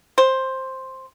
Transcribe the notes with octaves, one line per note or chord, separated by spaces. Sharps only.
C5